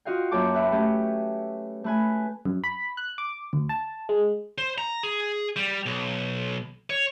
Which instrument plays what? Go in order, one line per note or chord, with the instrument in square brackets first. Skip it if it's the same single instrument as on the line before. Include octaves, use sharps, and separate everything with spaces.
[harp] F4 F#4 D#5 F5 G5
F#2 A#3 C#5 G5 A5 D6
B4 E5
A3 C#4 G4
A3 B4 G#5
[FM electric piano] F#2
B5
F#6
D6
D2
A5
G#3
[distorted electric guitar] C5
A#5
G#4
G3
B1
C#5